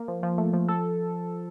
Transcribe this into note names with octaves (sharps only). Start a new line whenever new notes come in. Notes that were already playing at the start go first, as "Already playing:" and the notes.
Already playing: A#3
F3
F3
A3
F3
A4